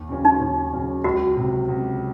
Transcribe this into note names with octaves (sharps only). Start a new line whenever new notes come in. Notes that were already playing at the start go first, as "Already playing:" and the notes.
Already playing: D#2
C#3 F#3 C#4
D#4
D#2
C#3 F#3 C#4
C#2 F#4
C3 F#3
C#2